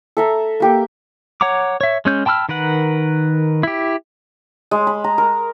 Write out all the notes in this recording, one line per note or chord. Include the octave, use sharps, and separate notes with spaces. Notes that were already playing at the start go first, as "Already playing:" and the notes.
A4 E5 A#5
A#3 G4 A#4
C#5 F#5 A#5 D6
C#5 E5
G#3 C#4 G6
G5 A5 B5 E6 F6
D#3 A#4 B4 F#5
E4 G4
G#3
B5
A#5
A#4